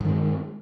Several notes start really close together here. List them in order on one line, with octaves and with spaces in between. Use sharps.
G2 D#3 G#3